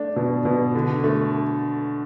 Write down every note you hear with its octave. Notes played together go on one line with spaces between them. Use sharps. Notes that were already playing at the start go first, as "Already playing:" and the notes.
Already playing: A3 D4
B2
B2
D3
A3